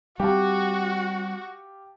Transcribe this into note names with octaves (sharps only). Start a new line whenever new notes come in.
G3 C4 F#4 G4 F5 A5